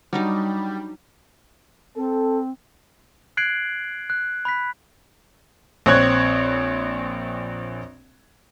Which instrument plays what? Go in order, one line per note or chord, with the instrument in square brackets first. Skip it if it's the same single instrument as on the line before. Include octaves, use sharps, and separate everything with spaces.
[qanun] F#3 D4 D#4 [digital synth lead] G3
[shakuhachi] C4 [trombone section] A4
[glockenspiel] F#6 G#6 C7 D7 F#7
F#6
B5 F#6 B6
[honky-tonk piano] A#1 C4 C#5 F#6 G#6